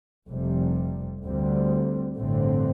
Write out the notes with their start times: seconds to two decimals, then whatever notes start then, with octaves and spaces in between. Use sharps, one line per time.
0.28 F1 F2 C3 G3
1.23 D2 D3 G3 C4
2.18 A1 G2 D3 A3 C4